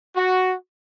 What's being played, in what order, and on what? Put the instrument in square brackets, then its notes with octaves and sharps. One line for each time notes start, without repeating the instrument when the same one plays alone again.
[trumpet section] F#4